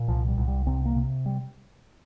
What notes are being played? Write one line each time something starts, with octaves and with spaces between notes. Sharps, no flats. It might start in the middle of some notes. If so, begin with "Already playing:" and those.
Already playing: A#2
C2 F3
G3
C2
G3
C3 C4
A#3
C3
G3